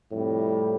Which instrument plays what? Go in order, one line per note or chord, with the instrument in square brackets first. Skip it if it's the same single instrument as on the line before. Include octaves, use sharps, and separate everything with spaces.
[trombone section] F2 C3 G3 [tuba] A2